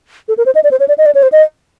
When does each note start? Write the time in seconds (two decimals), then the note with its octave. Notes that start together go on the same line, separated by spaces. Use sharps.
0.28 A4
0.38 A#4
0.46 C5
0.55 D#5
0.64 D5
0.71 C5
0.80 C#5
0.88 D5
0.98 D#5
1.06 D5
1.15 C#5
1.23 C5
1.32 D#5